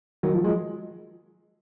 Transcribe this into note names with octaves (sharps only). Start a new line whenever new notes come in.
D#3 F#3
F3
F3 G#3